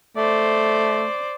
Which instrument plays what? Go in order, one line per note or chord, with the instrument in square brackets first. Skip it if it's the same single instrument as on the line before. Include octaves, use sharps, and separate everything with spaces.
[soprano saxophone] A3 [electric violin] C5 D5